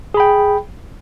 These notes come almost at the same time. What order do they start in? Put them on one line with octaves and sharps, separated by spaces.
G#4 B5 G5